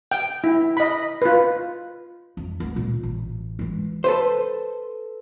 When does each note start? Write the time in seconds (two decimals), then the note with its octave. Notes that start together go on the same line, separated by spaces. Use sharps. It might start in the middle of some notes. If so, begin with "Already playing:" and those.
0.11 G5
0.44 E4
0.77 D#5 B5
1.22 F4 B4
2.37 F2
2.60 D2 G#3
2.76 A#2
3.03 A1
3.59 E3 G#3
4.04 A4 B4 C5